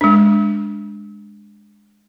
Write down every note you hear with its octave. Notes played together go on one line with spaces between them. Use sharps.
G#3 D4